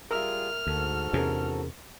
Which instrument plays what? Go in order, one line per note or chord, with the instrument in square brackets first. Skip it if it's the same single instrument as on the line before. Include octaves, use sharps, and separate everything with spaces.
[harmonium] G3 F4 G#4 [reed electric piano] A#4 E5 [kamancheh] F6
[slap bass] D2 [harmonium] G#2 F#4 A4
[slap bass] E2 C3 [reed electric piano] C#4 G#4 A#4